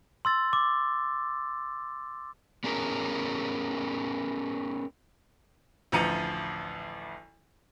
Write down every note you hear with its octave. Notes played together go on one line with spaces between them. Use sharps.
C6 E6 A6
D6
B3 C#4 G#4 A#4
A1 D2 F3 A#5 C#7 D#7